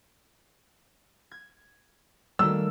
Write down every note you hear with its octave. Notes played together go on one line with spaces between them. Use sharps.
G#6
D#3 G3 A3 A#3 E6